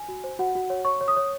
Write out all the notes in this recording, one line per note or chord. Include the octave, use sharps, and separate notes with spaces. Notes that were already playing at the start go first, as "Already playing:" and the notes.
Already playing: G#5
F#4
C5
F#4 F#5
F#4
C#5
C#5 C#6
C#5
D#6
C#5